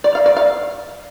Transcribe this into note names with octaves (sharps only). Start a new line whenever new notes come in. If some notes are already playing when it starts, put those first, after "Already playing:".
D5
F5
D5
F5